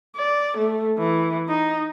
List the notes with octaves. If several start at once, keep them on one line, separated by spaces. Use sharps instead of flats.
D5
A3
E3
D#4